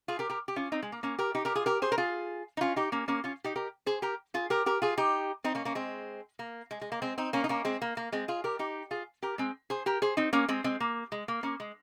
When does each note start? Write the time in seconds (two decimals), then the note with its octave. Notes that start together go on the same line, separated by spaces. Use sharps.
0.08 F4 G#4
0.19 G4 A#4
0.30 G4 A#4
0.48 G4
0.56 C#4 F4
0.72 C4 D#4
0.82 G#3
0.92 A#3
1.03 A#3 C#4
1.19 G4 A#4
1.35 D#4 G4
1.45 G4 A#4
1.55 F4 G#4
1.66 G4 A#4
1.82 G#4 C5
1.92 A#4
1.98 F4 G#4
2.57 D#4
2.61 C#4 F4
2.76 D#4 G4
2.92 A#3 C#4
3.08 A#3 C#4
3.24 C#4 F4
3.44 D#4 G4
3.56 G4 A#4
3.86 G#4 C5
4.02 G4 A#4
4.34 F4 G#4
4.50 G4 A#4
4.66 G4 A#4
4.82 F4 G#4
4.97 D#4 G4
5.44 C4 D#4
5.55 A#3 C#4
5.65 A#3 C#4
5.75 G#3 C4
6.39 A#3
6.71 G#3
6.81 G#3
6.92 A#3
7.02 G#3 C4
7.18 C4 D#4
7.33 A#3 C#4
7.44 D#4
7.49 A#3 C#4
7.65 G#3 C4
7.82 A#3
7.97 A#3
8.12 G#3 C4
8.28 F4 G#4
8.44 G4 A#4
8.59 D#4 G4
8.91 F4 G#4
9.23 G4 A#4
9.38 G#3 C4
9.70 G#4 C5
9.86 G4 A#4
10.02 G#4 C5
10.17 C4 D#4
10.33 A#3 C#4
10.48 G#3 C4
10.64 G#3 C4
10.80 A#3
11.12 G#3
11.28 A#3
11.43 A#3 C#4
11.60 G#3